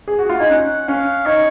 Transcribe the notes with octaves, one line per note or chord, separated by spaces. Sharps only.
G#4
F#4
F4
D#4 G#5
C#4 F#5
C#4 F5
D#4 C#5